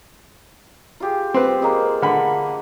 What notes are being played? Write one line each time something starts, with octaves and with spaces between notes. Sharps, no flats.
F4 G4 G#4
C4 B4 C5
G#3 A#3
D3 B5